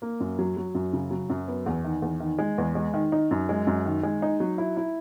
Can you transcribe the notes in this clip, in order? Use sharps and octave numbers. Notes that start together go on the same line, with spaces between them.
A#3
F#2
F#3
F#3
F#2
C#3
F#3
F#2
B3
E2
D#3
E2
D#3
G#3
E2
G#3
D#3
D#4
F#2
G#3
F#2
D#3
G#3
D#4
F#3
E4
E4